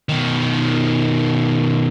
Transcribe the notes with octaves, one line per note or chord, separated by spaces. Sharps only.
B2 D#3